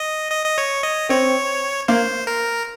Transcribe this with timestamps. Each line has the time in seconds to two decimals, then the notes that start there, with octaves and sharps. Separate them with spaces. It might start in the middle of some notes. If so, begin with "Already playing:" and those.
Already playing: D#5
0.31 D#5
0.46 D#5
0.58 C#5
0.83 D#5
1.09 C4 C#5
1.88 A#3 C5
2.27 A#4